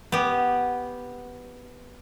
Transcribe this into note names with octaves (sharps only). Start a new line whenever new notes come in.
B3 G4